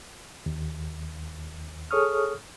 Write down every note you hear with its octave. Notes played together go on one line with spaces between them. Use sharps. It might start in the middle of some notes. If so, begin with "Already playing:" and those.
D#2
G#4 A4 C#5 C#6 D#6 F6